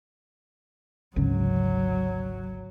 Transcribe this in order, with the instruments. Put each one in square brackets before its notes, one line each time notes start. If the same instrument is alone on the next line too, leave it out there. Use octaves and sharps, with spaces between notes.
[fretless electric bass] G#1 D2 C#3 [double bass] F#3